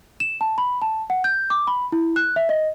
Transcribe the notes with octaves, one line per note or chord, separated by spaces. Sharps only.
E7
A5
B5
A5
F#5
G6
D6
B5
E4
F#6
E5
D#5